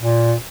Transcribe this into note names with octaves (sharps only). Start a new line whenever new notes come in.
A#2